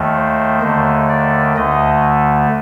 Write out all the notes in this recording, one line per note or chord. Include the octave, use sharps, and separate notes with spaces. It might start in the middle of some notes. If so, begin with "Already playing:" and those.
Already playing: D#2 D#3 A3
C5
D#2 D3 A3
D5
D2 D3 A3 D#5